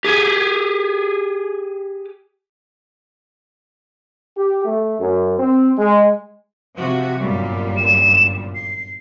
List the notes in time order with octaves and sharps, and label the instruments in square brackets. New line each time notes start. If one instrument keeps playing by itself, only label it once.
[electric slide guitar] G4 G#4
[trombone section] G4
A3
F#2
C4
G#3
[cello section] C3 F3 F#4
[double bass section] G1 [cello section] F#2 A#2 G3
[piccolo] E7
C7